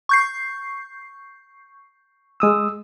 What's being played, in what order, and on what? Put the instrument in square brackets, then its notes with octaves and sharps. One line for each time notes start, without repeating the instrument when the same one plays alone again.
[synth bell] C#6 G6 C7
[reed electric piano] G#3 D#6 E6